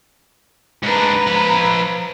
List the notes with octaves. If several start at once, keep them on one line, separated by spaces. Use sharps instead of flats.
G#2 D4 B4 A#5
F3 B5